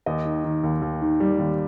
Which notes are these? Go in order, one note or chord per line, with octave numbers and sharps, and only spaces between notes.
D#2 D#5
D#3
D#3
D#2
D#2
D#3
G3
D#2